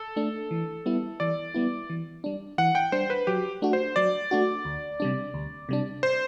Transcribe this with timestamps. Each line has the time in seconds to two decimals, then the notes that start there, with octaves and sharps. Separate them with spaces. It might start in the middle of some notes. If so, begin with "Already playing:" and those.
Already playing: A4
0.16 A3 D4
0.51 E3
0.86 G3 B3 E4
1.20 E3 D5
1.54 G3 B3 E4
1.90 E3
2.24 G3 D4
2.58 E3 F#5
2.75 G5
2.92 G3 D4 C5
3.10 B4
3.27 F#3 G4
3.62 A3 D4 F#4
3.73 C5
3.96 F#3 D5
4.31 A3 D4 F#4
4.65 D2
5.00 C3 G3 D4
5.34 D2
5.69 C3 G3 D4
6.03 C5